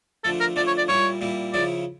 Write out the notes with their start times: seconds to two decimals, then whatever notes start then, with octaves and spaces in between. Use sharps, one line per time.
0.24 D3 F3 A3 A4
0.41 A#4
0.56 D3 F3 A3 D5
0.67 C#5
0.78 D5
0.88 A#2 G3 A#3 E4 C#5
1.21 A#2 G3 A#3 E4
1.54 C#3 F3 C#4 E4 D5